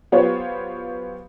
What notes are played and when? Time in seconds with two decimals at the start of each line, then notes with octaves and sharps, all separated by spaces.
0.12 F#3 B3 F4 G4 C5 C#5